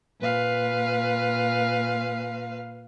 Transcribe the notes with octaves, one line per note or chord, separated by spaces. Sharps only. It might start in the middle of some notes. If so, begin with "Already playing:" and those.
A#2 B4 F5